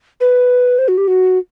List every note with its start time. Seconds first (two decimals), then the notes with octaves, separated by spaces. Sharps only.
0.20 B4
0.78 C5
0.88 F#4
0.98 G4
1.08 F#4